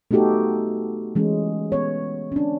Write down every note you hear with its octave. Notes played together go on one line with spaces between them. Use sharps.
A3 B3 D#4 F#4 G4 A4
E3 G#3 C#4
B3 C#5
C#4 D4